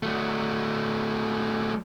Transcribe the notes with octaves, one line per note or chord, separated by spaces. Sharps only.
F#3 A3